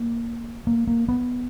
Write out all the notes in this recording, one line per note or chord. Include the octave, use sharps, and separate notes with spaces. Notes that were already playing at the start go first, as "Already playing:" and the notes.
Already playing: A#3
A#3
A#3
B3